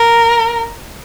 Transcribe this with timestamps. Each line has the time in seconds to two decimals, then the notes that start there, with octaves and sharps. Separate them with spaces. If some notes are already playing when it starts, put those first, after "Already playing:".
Already playing: A#4